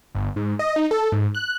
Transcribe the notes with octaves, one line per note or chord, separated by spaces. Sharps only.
G1
G#2
D#5
D#4
A4
G#2
F#6